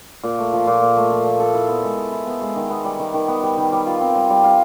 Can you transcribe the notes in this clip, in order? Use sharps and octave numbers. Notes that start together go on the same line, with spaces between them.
A#2
A3
F3
A#2
A#2
A3
F3
A#2
A4
E4
B3
G#3
A4
E4
B3
G#3
D#3
B3
G3
D#3
D#3
B3
G3
D#3
G3
F4
C4
G3
G3
F4